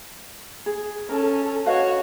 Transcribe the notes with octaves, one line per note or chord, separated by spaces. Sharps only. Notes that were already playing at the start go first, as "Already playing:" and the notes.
G#4
C#4 A4 A#4
F#4 B4 C#5 D#5 F5